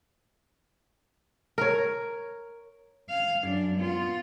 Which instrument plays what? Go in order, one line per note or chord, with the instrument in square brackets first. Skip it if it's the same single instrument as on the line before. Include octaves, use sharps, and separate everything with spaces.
[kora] A#4 C#5
[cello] F5
F#2 D4
B3 F4